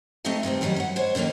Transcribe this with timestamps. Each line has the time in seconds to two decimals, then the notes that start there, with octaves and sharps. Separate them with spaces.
0.25 A3 C4 D#4 A4 D#5 A5
0.43 G2 C3 D#3 C4
0.61 F#2 D#3 F#3 G3 D#4
0.76 E5 F#5
0.96 G#3 C5 C#5
1.15 B2 D3 D#3 A#3 C#4